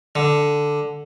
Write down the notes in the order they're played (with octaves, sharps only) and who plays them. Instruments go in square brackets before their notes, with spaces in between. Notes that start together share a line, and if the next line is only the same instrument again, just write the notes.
[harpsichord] D3